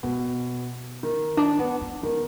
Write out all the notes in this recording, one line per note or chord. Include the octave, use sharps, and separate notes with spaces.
B2 B3
D#3
D4
B3
B3
D#3 B3